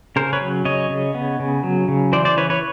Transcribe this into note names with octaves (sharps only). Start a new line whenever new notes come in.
C#3 A#4 C5
B4 C#5
F#3
C#3 C#5 D#5
C#3
B3
C#3
F#3
C#3
E3 C5 D5
C5 D5
E3 B4 C#5
B4 C#5